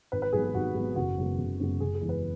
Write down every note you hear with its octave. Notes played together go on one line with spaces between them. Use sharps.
G#1 B4
B4
G#2 F#3 B3 G#4
G#4
G#1 F#4
G#2 F#3 B3
F#1 F#4
F#2 C#3 G#3 B3
F#1
F#2 C#3 G#3 B3
F#1 G#4
G#4
E2 E3 G#3
B4